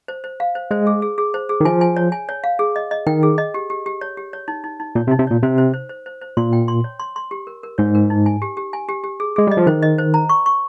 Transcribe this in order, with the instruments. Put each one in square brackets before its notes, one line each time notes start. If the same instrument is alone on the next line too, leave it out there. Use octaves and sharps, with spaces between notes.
[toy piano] C5
C5
F5
C5
[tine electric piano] G#3 [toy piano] C5
[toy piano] G#4
G#4
G#4
C5
G#4
[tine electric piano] D#3
[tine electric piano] F3 [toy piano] G#5
[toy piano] G#5
C#5
G#5
C#5
F5
G#4
D#5
D#5
[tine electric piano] D#3 [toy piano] G5
[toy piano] G#4
D#5
G4
G4
G4
C#5
G4
C#5
D#4
D#4
D#4
[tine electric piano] A#2 [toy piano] C#5
[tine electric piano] C3
[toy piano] D#4
[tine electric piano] C3
[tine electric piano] A#2 [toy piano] C#5
[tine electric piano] C3 [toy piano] C5
[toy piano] C5
C5
C5
C5
C5
[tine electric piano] A#2 [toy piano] C6
[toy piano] G5
C6
C#5
C6
C6
G4
A#4
A#4
[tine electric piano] G#2 [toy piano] C#5
[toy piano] A#4
D#4
G#5
G4
G4
G#5
G4
G4
G#4
[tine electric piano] G#3 [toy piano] G#4
[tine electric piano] G3 [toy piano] D#5
[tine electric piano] F3
[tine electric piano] D#3 [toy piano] C5
[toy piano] D#5
C5
A#5
C#6
C#6